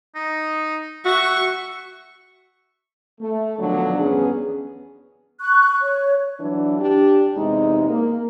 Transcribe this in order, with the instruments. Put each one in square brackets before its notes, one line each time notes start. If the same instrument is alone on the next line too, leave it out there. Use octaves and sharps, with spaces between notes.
[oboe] D#4
[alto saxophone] F#4 [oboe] E5 [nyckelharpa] C#6
[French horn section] A3
B2 D3 D#3 F3 F#3 D4
E2 G2 B3 C#4 G#4
[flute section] C#6 F#6
C#5
[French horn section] E3 F#3 D4
D4 G4
E2 C3 G#3 D#4
A#3